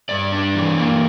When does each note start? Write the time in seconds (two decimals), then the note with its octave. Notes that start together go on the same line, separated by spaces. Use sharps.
0.09 G2 D5
0.32 D4
0.55 E3
0.78 A#3